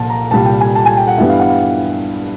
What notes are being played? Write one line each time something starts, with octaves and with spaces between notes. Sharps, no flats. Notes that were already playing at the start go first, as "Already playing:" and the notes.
Already playing: C2 A#2 F3 A#3 A5
A#5
C2 A#2 G3 A5
G5
G#5
A5
G#5
G5
F#5
G2 E3 G3 B3 E5
F5
F#5
F5